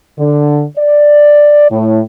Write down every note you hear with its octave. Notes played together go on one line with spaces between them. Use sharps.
D3
D5
A2